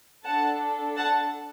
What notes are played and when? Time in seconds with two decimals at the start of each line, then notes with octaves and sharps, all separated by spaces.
0.25 D4 A4 F#5 A5
0.95 F#5 A5